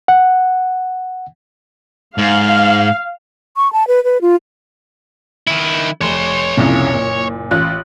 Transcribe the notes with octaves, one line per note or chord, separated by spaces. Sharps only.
F#5
G#2 F5
C#6
A5
B4
B4
F4
D#3 E4
F1 C#5 C6
C2 F2 A#2 C#3
F#1
A1 F4 F#6